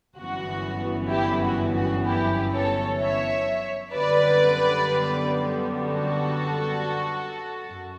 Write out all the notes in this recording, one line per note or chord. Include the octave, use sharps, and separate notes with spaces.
G1 F#2 E3 B3 F#4
E4 G4
F#4
F#4
E4 G4
A4 C#5
C#5 E5
F#2 D3 G3 B3 B4 D5
F#4 A4
F#2